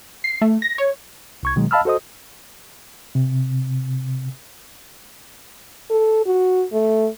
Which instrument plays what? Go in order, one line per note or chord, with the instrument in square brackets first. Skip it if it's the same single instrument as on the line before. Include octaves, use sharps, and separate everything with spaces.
[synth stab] C7
A3
A#6
C#5
[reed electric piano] C2 C#6 G#6
B2 D#3 F#3 G#3
D#5 F5 A5 B5 E6 F6
F#4 A4 C5 D#5 D#6
C3
[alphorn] A4
F#4
A3